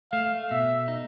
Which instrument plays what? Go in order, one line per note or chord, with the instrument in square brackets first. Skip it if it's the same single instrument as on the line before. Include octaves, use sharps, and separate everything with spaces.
[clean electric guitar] A3 [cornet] F5
[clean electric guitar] B2 [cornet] E5
[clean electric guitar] D#4